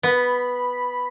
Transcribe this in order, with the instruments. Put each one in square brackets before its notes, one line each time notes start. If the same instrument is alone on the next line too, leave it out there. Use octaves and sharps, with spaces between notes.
[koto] B3 [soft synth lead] B5